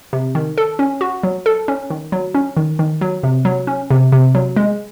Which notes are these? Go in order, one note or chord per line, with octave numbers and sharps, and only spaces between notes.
C3
D#3
A4
C#4
F#4
F#3
A4
C#4
D#3
F#3
C#4
D#3
D#3
F#3
C3
F#3
C#4
C3
C3
F#3
G#3